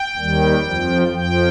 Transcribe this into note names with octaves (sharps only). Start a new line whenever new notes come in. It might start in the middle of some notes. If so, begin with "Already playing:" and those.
Already playing: G5
D#2 D#3 G3
F2 F3
F2 F3 G5